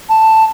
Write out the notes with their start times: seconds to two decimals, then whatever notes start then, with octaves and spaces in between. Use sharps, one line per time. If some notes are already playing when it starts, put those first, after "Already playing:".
0.09 A5